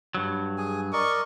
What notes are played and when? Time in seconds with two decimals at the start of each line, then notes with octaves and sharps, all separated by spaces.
0.15 G2 F#3
0.58 G#4 G#5
0.93 A#4 D5 D#5 C#6